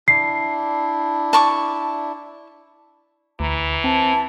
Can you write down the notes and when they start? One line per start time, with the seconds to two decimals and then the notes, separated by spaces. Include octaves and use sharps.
0.08 D4 E4 C7
1.33 A5 C#6 D6
3.40 D2 E3 A#5
3.84 C4 A5